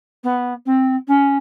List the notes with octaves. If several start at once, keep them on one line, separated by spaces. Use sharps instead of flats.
B3
C4
C#4